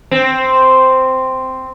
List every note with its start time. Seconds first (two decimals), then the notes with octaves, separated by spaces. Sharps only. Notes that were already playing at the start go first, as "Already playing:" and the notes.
0.11 C4